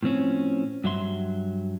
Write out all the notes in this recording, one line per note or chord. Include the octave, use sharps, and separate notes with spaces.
A2 F3 C4 C#4
G2 F#3 E5 C6